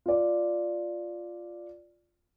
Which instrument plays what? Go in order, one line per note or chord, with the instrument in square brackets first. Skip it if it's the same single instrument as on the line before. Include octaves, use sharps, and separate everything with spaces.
[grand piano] F4 D5